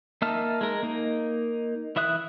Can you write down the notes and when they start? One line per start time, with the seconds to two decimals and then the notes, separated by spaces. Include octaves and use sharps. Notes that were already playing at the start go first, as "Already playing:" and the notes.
0.22 A#3 D#4 E5 A5 F6
0.61 G#3 A#4
0.83 A#3 D#4
1.96 E3 E4 E5 D#6 F#6